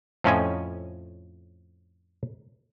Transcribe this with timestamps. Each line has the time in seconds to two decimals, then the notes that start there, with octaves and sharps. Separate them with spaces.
0.24 F2 A2 F3 C#4 D#5 G#5